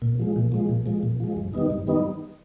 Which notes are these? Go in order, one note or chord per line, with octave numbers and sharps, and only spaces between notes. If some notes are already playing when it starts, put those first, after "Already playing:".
A#2
F3 G#3
A#2
F3 G#3
A#2
F3 G#3
A#2
F3 G#3
G2
D#3 G3 B3 D#4
G2
D#3 G3 B3 D#4